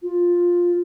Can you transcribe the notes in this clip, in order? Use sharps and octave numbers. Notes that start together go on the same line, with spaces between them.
F4